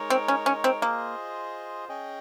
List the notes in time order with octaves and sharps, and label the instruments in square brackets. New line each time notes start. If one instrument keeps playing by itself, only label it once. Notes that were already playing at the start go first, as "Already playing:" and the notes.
Already playing: [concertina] G#3 D#4 A#4 C#5
[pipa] C4
C#4
C#4
C4
[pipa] A#3 [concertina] F4 G#4 C5 D#5
[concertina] C#4 G#4 D#5 G5